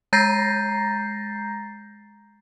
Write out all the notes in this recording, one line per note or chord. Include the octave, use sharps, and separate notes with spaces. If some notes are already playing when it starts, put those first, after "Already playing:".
G#3 A#5 G6 A6 A#6 C7